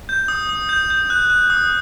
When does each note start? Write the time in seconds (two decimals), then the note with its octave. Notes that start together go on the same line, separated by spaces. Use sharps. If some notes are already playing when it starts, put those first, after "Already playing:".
0.09 G6
0.28 D#6
0.49 D#6
0.69 G6
0.90 G6
1.10 F#6
1.30 F#6
1.50 D#6